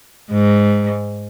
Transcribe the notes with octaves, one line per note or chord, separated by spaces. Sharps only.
G#2